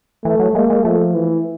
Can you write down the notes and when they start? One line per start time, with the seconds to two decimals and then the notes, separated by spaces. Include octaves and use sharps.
0.25 E3 A3
0.40 F#3
0.55 G#3 A#3
0.70 G#3
0.84 F3 A3
1.15 E3